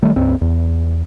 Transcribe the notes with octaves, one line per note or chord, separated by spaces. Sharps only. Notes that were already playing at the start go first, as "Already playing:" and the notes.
D#3 G3 A3
C#2 G2 C4
E2